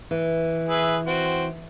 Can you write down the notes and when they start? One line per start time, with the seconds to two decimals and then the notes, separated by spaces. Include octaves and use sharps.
0.11 E3
0.69 G#4 B4 E5
1.07 C4 F#4